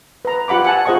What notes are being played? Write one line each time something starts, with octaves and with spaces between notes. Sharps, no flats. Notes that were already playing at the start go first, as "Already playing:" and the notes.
B4 A#5
F4 G4 F#5 B5 D6
F#5 G#5 A5
F4 G#4 C5 D#5 F#5 C#6